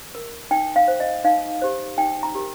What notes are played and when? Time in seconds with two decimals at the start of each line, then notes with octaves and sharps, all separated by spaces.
0.15 A#4
0.51 D#4 G5
0.76 F5
0.88 C5
1.00 D#5
1.24 D#4 F5
1.62 G4 C5
1.98 D#4 G5
2.23 A#5
2.35 G4 A#4